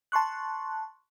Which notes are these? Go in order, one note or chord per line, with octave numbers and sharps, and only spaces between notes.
A5 C6 C#6 F#6